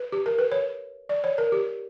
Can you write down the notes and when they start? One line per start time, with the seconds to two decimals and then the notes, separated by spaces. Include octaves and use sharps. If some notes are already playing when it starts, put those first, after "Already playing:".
Already playing: B4
0.13 G4
0.26 A#4
0.39 B4
0.52 C#5
1.09 D5
1.24 C#5
1.38 A#4
1.52 G4